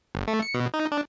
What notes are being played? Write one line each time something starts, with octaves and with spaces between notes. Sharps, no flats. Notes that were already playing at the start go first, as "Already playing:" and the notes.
G1
A3
C#7
B2
D#4
D4